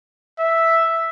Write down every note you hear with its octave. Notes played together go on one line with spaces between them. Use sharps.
E5